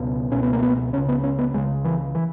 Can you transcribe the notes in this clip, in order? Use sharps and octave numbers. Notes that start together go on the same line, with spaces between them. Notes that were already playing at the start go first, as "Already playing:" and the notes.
Already playing: C#2 B2
C#2 B2 C#4
B3
A#3
B3
C#2 C#3 C#4
B3
C#4
B3
C#2 C#3 G#3
E3
E3